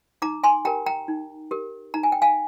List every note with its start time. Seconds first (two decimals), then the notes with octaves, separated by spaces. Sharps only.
0.22 D#4 A#5 D6
0.43 G#5 C6
0.65 G4 A#4 G5 A#5
0.86 G5 A#5
1.08 D#4
1.51 G4 A#4
1.94 D#4 A#5
2.03 G#5
2.12 G5
2.22 F5 G#5